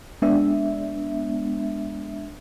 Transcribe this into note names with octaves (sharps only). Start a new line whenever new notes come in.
G#3 B3 D4 E5